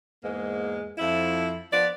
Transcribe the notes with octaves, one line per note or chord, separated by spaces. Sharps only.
E2 G#2 G#3 A#3
F2 F3 E4
F3 B3 D5